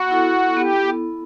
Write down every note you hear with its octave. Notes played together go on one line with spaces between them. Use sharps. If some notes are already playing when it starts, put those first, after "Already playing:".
Already playing: B3 F#4
E4 A4
B3 G4